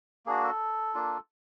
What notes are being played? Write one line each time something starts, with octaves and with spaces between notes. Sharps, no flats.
A#3 D4 F#4 G#4
A4
A#3 D4 F4